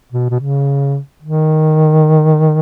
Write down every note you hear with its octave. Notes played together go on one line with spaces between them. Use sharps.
B2
B2
C#3
D#3